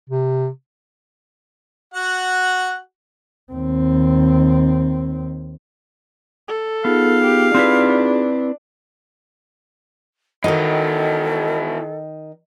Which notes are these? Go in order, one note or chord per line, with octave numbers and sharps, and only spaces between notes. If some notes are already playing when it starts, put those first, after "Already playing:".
C3
F#4 F#5
D#2 C4
A4
B3 D#4 F4 G#4 F5
G4
C4 D4 E4 B4
D#3 E3 D#4 F#4 A4 D#5